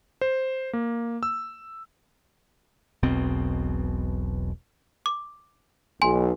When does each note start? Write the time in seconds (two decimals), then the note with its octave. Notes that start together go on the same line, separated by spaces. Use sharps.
0.21 C5
0.73 A#3
1.23 E6
3.03 E1 B1 B2 C4
5.06 D6
6.02 B1 G#5 C6